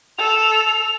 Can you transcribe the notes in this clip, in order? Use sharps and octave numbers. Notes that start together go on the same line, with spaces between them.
A4 F7